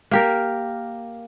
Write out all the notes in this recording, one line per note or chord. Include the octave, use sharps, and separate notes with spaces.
A#3 G4 A#4